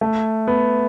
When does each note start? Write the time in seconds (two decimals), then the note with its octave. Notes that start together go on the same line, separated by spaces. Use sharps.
0.01 A3
0.48 B3